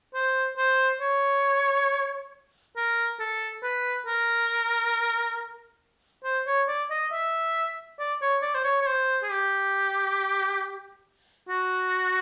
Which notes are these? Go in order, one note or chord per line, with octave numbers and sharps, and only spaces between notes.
C5
C5
C#5
A#4
A4
B4
A#4
C5
C#5
D5
D#5
E5
D5
C#5
D5
C5
C#5
C#5
C5
G#4
G4
F#4